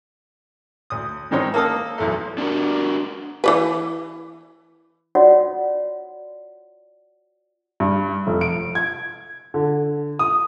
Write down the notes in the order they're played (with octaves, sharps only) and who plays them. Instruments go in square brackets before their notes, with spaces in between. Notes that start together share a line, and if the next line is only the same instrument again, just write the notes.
[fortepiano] D2 D#6
G#2 D#3 G#3 C4 C#5
A#3 A4 D#6
B1 E2 A3
[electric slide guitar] D4 F#4 A#4
[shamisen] E3 G3 B4
[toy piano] F4 F#4 C#5 D5 F#5
[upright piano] G2
F1
D7
G#6
D3
D#6